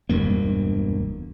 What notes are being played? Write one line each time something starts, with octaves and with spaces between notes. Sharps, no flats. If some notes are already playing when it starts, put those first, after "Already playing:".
E1 D2 G2 A#3